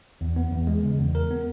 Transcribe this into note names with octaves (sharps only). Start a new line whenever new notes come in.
E2
B3
E2
G#3
C#3
E2
A#4
B3